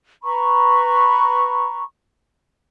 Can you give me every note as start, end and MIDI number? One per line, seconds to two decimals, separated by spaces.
0.24 1.82 71
0.24 1.82 82
0.24 1.82 83
0.24 1.82 85